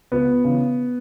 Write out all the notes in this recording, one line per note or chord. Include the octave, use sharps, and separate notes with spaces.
C#2 B3
C#3 E3